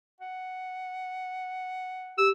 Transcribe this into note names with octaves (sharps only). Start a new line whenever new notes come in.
F#5
G4 E6